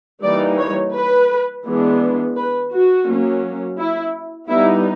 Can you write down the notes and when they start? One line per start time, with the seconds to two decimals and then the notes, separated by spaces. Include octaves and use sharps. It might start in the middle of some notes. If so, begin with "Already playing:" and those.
0.23 E3 G3 A#3 D#4 D5
0.59 C#5
0.94 B4
1.65 E3 G#3 B3 D4
2.36 B4
2.72 F#4
3.07 F#3 A#3 C#4
3.79 E4
4.49 G3 B3 D#4 E4